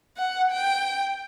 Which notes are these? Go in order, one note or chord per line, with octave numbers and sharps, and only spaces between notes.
F#5
G5